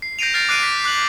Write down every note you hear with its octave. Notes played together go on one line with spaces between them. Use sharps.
C7
G6 A#6 C7 D7 D#7 F7
F6 A6 C7 D7
D6 F#6 C7 D7 D#7
A6 B6
D6 F#6 G6 F#7